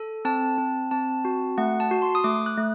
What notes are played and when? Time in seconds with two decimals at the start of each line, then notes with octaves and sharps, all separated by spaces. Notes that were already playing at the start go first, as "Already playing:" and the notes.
Already playing: A4
0.25 C4 A5
0.58 C4
0.91 C4 A5
1.25 F#4
1.58 A3 F#5
1.80 A5
1.91 F#4
2.02 C6
2.15 D#6
2.24 A3 D6
2.46 F#6
2.57 A3